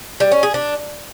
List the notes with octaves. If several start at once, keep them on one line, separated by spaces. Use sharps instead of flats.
G3
C#4
G#4
D4